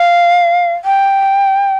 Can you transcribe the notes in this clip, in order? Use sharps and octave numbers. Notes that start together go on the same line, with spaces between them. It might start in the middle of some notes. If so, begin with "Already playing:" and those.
Already playing: F5
G5